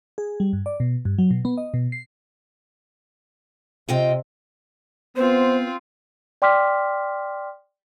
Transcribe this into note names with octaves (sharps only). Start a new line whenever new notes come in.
G#4
G3
G2
D5
B2
G2
F#3
B2
B3
D#5
B2
C7
C3 F4 D#5 G5
B3 C4 F4 C5
D5 G5 C6 D6 F6 B6